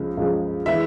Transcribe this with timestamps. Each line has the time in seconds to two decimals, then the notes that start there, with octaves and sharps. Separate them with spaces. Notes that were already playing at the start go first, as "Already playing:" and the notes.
Already playing: C#2 C#3 F3 G#3
0.17 C#2 C#3 F3 G#3
0.66 E3 G#3 E5